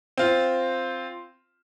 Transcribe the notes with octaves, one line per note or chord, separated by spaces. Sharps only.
C4 F4